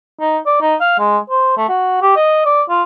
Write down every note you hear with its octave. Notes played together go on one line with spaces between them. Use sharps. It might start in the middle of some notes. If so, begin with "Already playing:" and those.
D#4
D5
D#4
F5
G#3
C5
A3
F#4
G4
D#5
D5
F4